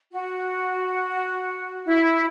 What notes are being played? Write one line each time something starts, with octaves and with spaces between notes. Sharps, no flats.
F#4
E4